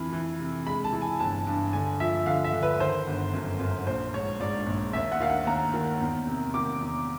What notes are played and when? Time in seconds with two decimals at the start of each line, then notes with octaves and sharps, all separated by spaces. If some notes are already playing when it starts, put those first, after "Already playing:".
Already playing: F2 E3 B5
0.12 E3
0.39 C3
0.67 G#3 B5
0.84 A5
0.93 E3
1.02 G#5
1.19 G1 A5
1.47 G2
1.73 D3 G#5
2.00 F3 E5
2.26 D3 F5
2.44 E5
2.53 D3
2.63 B4
2.80 D#3 C5
3.07 G1
3.33 F#2
3.60 F#2
3.87 A#1 C5
4.14 G#2 C#5
4.40 G#2 D5
4.67 A#1
4.93 D#2 E5
5.12 F#5
5.20 D#3 F5
5.29 F#5
5.47 D#2 A#5
5.74 D#3
6.00 E2
6.27 C3
6.54 D#3 D6
6.81 E2